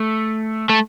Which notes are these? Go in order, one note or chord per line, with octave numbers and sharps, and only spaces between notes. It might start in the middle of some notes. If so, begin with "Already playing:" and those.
Already playing: A3
A3